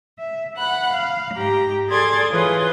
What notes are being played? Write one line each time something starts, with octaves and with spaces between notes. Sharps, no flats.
E5
F#5 B5 F#6
F5
G#2 G4 A#5
G#4 A4 D5 C6 G#6 A6
E3 F4 G#4 B4 C#5 C6